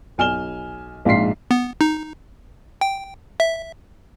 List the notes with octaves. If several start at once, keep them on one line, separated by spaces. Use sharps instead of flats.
B1 G#5 F6 E7 G7
A#1 G#2 F5 C6 B6 C7
B3
D#4
G5
E5